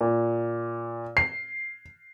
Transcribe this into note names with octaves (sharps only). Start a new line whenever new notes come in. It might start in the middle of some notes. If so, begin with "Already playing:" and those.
A#2
C7